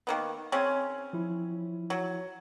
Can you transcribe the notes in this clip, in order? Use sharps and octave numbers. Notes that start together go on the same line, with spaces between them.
D#3 A#3 B3
C#3 C4 C#4
F3 E4
F#3